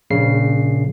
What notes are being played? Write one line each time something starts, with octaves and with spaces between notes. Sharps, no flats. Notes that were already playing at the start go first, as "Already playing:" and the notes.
A#1 C#3 C7